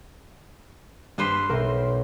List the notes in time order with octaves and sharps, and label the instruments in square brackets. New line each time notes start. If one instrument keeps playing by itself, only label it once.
[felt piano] G2 C7 [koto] G3 B4 C5
[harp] B1 [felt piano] A#4 E5